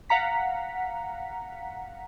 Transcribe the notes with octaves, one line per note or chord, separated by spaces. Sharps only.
F5 F#5 A#5 B6